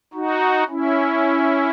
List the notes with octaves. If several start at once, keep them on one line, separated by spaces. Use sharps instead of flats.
D#4 F#4
C#4 E4